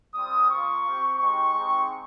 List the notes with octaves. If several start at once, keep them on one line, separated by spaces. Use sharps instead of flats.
G3 C4 F4 D#6
A#3 F4 C#6
C4 G4
G#3 D#4 G4 C#6
G#3 C4 D#4 G4